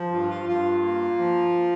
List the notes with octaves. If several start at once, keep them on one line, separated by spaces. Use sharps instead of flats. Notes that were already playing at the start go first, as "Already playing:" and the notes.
Already playing: F3
G2 F4
F4
G2 F4
A#3
F3